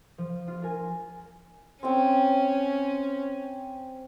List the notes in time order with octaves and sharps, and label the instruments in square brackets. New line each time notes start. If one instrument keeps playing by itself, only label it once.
[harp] F3
F4
F4 A#4 G#5
[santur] C4 G5 [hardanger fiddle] C#4